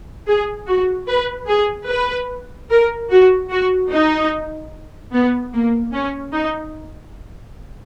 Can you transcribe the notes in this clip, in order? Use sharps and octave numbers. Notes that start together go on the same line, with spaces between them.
G#4
F#4
B4
G#4
B4
A#4
F#4
F#4
D#4
B3
A#3
C#4
D#4